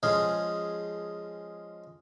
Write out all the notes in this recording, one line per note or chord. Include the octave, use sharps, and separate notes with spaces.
F3 G#3 C#4 F4 G#4